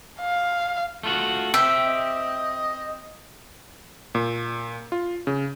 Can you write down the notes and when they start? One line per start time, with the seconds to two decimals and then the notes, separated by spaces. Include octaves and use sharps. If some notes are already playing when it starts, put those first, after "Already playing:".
0.21 F5
1.03 A3 F4 F#4
1.54 C4 G4 E5
1.88 D#5
4.15 A#2
4.92 F4
5.27 C#3